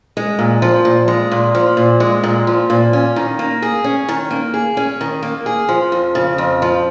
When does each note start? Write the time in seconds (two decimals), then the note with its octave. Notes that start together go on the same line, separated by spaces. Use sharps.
0.17 G#3
0.39 A#2
0.62 F3
0.85 A#2
1.08 G#3
1.31 A#2
1.55 F3
1.77 A#2
2.00 G#3
2.23 A#2
2.47 F3
2.70 A#2
2.93 C#4
3.16 D#3
3.39 A#3
3.62 G#4
3.84 C#4
4.08 D#3
4.31 A#3
4.54 G#4
4.77 C#4
5.01 D#3
5.23 A#3
5.46 G#4
5.69 F3
5.92 F2
6.15 C#3
6.38 F2
6.62 F3